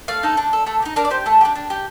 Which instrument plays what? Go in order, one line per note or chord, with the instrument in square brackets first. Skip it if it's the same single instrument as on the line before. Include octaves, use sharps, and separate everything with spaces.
[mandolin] A3 F5
D#4 A4
D4
A4
A3 A4
G4
D#4
D4 A#4
D5
G4 C5
A3 A5
D4 G4
D4
G4